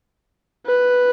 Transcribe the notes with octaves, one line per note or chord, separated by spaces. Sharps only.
B4